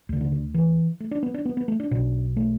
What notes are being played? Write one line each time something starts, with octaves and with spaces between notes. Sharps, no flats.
D2 D3
D3
D3
E3
A3
D4
B3
D4
B3
B3
A3
D4
B1 B2 D4
A3